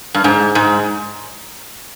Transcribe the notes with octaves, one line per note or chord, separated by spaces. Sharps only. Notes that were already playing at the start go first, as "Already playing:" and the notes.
G2
G#2
G#2